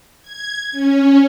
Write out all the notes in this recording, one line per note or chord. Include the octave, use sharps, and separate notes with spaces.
G#6
C#4